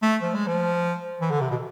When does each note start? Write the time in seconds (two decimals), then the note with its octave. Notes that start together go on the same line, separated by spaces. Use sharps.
0.03 A3
0.22 F3
0.34 G#3
0.47 F3
1.21 E3
1.31 D3
1.41 C3
1.51 B2